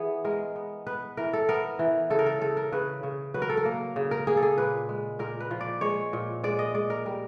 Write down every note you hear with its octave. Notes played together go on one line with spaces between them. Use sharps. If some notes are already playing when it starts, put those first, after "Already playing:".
Already playing: E3 B3 G#4
G#3 A#4
B3
B3 B4
E3 A#4
A4
B3 A#4
E3
C#3 A4
A#4
A4
C#3 A4
A#4
C#3 B4
C#3
F#3 B4
A#4
A4
A#4
A#3
C#3
A#4
A#3 G#4
A4
G#4
A#2 B4
G#3
A#2 A#4
B4
F3
D5
G#3 C#5
A#2
G#3 D5
D#5
G#3 D5
A#4
G3 A#4